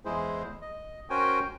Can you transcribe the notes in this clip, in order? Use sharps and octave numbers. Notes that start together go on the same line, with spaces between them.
E2 G#3 E4 G#4 C5
D#5
C#4 F#4 A#4 C5 G5 G#5